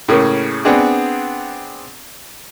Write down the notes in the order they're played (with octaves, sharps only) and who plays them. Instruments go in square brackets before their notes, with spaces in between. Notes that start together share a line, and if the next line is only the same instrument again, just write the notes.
[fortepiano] A2 C#3 A#3 C#4
B3 C4 D4 G#4